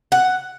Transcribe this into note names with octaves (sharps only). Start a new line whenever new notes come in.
F#5